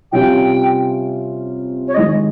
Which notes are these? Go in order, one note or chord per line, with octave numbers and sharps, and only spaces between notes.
C3 G3 C#4 F4 G5
C#5
D#3 G#3 C#4 D#5